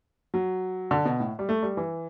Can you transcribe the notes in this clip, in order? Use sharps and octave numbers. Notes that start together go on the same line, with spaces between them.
F#3
D3
B2
A2
G3
A3
G3
E3